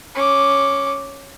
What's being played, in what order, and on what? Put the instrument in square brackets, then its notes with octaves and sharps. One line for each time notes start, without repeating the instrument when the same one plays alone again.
[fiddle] C#4 D6